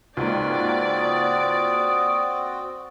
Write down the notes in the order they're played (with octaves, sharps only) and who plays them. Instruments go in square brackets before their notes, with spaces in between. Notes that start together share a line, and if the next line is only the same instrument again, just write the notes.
[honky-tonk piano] C#2 G#2 A#3 [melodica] C4 F#4 [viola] D5
[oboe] D#6